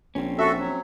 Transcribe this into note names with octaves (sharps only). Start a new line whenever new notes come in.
A#1 C4 C#4
F#4 A4 E5
F#3